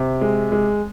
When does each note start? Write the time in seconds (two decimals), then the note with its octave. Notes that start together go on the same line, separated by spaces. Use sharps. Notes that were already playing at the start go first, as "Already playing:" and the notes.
Already playing: C3
0.21 G#3
0.52 G#3